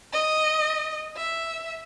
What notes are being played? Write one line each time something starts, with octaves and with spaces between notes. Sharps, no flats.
D#5
E5